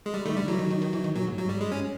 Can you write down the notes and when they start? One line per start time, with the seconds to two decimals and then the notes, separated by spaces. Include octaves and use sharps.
0.06 G#3
0.14 G3
0.25 D#3 A3
0.36 D3 G3
0.48 E3 F#3
0.59 D#3
0.71 D#3
0.82 D#3
0.93 E3
1.04 D#3
1.16 A#2 F#3
1.27 G#2
1.38 G2 F#3
1.49 G#2 G3
1.59 G2 G#3
1.72 C#4